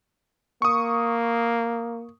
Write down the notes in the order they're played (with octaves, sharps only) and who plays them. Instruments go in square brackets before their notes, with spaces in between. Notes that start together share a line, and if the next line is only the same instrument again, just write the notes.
[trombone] A#3 [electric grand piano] C#6 D#6